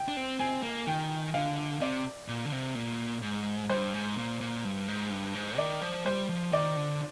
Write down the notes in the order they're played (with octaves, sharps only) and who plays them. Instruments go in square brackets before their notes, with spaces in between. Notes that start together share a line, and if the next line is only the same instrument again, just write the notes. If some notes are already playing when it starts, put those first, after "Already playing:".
Already playing: [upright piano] G5
[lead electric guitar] D4
C4
[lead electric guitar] C4 [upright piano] G#5
[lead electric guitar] A#3
[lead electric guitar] D#3 [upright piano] G5
[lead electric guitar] D3 [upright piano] F5
[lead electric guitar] C3 [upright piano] D5
[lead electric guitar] A#2
D3
C3
A#2
G#2
[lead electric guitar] G2 [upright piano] C5
[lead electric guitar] G#2
A#2
A#2
G2
G#2
G2
G#2
[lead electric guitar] D#3 [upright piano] D5
[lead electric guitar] F3
[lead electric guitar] G3 [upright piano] C5
[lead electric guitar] F3
[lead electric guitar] D#3 [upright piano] D5
[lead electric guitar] D3